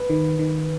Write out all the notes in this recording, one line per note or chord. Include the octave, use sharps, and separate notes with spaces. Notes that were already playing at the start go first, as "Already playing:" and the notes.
Already playing: B4
D#3
D#3